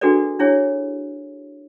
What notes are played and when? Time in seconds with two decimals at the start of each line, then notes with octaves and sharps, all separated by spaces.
0.01 D4 F#4 G#4 A4 B4 D5
0.39 D4 E4 G#4 C#5